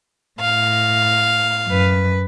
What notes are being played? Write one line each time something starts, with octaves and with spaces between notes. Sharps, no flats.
A2 F5
F#2 B4